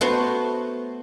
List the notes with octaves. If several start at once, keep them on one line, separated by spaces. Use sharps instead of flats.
A3 B3 F#4 C5